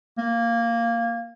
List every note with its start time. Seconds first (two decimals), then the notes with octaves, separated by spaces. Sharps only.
0.18 A#3